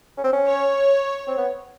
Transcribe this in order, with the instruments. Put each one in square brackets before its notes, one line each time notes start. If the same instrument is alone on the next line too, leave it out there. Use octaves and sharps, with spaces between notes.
[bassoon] C#4
C4
C#4
[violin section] C#5
[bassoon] C4
B3